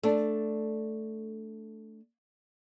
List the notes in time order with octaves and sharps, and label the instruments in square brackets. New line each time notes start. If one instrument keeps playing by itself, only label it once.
[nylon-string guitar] A3 D4